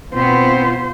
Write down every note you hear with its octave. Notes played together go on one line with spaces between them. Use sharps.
B2 B3 C4 F4 C5